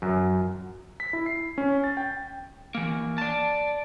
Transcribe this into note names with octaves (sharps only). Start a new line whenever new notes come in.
F#2
B6
E4
C7
C#4
A6
G5
E3 A#3
D5 A5